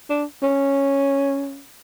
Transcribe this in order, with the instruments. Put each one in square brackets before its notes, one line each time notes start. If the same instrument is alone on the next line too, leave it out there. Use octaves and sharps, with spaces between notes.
[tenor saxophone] D4
C#4